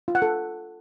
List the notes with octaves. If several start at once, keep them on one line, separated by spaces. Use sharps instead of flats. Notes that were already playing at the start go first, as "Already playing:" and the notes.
F4
F#5
A4